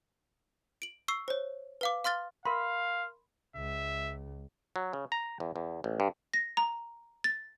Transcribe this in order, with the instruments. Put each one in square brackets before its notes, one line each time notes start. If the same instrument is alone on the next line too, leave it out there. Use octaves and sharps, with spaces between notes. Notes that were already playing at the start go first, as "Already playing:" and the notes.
[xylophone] D7 F#7
C#6 E6 C7
C5 C#5
B4 F5 D6
F5 C6 F6 A6 G7
[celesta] A#4 C6 [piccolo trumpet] F5 [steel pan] B5
[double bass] C#2 [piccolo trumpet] E5
[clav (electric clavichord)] F#3
C#3
A#5
E2
E2
A1
G2
[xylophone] A#6
A#5
A6